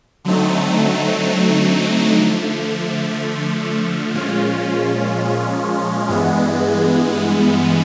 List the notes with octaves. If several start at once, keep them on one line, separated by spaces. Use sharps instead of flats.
D3 F#3 A3 C4 D#4
D3 F3 A3
A#2 F3 G#3 C#4 F4
G2 E3 G#3 B3